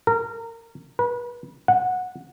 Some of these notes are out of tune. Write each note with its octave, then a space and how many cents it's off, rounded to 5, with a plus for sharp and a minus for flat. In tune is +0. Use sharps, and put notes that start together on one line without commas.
A#4 -25
B4 -35
F#5 -15